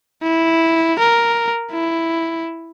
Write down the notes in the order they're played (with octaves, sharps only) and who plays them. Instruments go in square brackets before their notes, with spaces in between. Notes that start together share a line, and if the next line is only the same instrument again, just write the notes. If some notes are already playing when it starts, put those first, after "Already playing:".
[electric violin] E4
A#4
E4